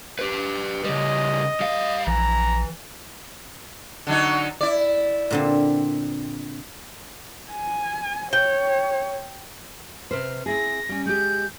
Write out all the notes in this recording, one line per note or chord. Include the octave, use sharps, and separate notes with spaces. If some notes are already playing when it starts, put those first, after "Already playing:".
G4 B4
C#3 G3 D#5
G3 F5
A#1 E3 A#5
D3 F#3 D#4
E4 D5
A#2 D3 C4
G#5
C#5 G5
C3 B4 C5 F6
C4 E4 G#4 A#6
G3 C#4
G#3 G4 G6